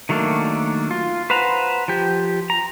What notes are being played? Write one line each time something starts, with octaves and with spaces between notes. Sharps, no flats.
D#3 F#3 A3 A#3 D4
F4
B4 C5 F#5 A#5
F3 G4
A#5